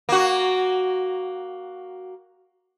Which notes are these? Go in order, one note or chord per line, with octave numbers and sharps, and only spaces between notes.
A#3 F#4